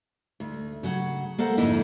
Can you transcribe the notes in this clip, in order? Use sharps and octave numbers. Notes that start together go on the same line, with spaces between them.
D2
C#3 F#3 F#5
A#3 A4 C5 F#5
F2 G#2 D3 A#3 D#4 E4